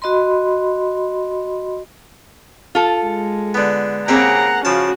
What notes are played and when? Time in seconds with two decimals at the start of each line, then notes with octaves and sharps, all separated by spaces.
0.02 F#4 D#5 B5 C6
2.75 F4 A4
3.05 G#3
3.54 D3 B3
4.08 C#3 A#3 C4 G4 G#4 F#5 A#5
4.65 C#3 F3 C#4 F#4 A5